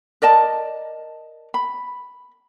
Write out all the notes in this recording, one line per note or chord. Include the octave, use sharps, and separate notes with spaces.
A#4 D5 D#5 A5
B5